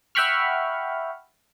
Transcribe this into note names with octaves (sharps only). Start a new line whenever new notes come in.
E5 F#5 G5 B5 C#6 F6